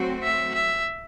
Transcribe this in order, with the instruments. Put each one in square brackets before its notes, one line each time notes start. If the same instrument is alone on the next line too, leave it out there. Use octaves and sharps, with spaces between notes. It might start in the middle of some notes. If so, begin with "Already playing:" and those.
Already playing: [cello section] F#3 A3 C4 F#4
[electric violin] E5
E5